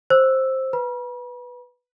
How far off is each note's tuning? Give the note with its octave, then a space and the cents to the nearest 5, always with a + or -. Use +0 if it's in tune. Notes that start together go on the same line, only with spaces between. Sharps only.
C5 +10 E6 +0
B4 +0 B5 -40